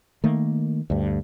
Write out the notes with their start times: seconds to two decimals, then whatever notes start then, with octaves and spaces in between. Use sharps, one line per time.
0.24 D#3 A3 A#3
0.90 D2 G2